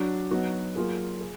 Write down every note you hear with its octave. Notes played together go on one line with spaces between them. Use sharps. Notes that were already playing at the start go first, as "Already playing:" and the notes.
Already playing: F#3 D4 F#4
F#3 B3 D#4 F#4
F#3 A#3 F4 G#4
G#4